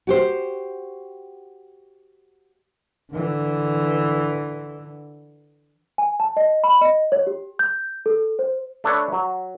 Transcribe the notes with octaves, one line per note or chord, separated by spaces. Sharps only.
F#4 G4 C5
D3 E3
G#5
A5
D#5
B5
D#5
C#5
G4
G6
A4
C5
A3 D4 A4 B4 C#5
F#3